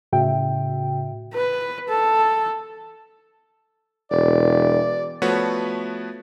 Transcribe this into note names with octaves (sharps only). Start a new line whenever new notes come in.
A2 C#3 F#4 E5 G5
B4
A4
E1 D5
F3 A3 B3 F#4 B4 C#5